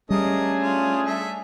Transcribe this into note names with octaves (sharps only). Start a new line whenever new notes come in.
G3 A3 C#4 D4 G#4 A#4 D#5
F4
A4 E5